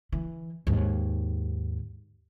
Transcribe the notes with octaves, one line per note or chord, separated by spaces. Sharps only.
E3
D#2 G#2